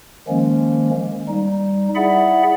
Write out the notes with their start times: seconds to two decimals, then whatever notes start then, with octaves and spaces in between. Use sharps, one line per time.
0.28 D#3 F3 G#3 A#3 C#4
1.28 G3 D#4
1.96 E4 G#4 D5 E5 F#5 B5